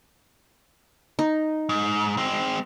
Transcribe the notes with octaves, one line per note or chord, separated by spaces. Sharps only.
D#4
G#2
G#3 C4